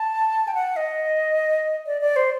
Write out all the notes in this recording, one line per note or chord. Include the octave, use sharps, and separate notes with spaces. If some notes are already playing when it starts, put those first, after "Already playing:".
Already playing: A5
G5
F#5
D#5
D5
D5
C5